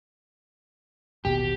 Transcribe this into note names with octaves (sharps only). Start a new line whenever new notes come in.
A1 D#2 B2 G4